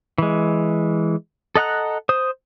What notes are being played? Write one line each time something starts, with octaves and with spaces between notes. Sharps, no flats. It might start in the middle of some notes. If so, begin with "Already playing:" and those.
E3 G#3
A4 D#5 F#5 A#5 F#6
C5 D#6